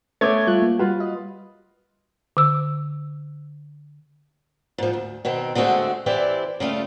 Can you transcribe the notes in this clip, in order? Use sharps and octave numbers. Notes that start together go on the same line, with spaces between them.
A3 B3 C#5 D6 G#6
G3 F4 F#6
A#3
G3 F4 F#4 B4
D#5
D3 E6
G#2 F3
D2
B2 D#3 C4
D3 G#3 A3 C4 F#4
E3 C4 E4 G4 D5
C#3 G3 A3 F4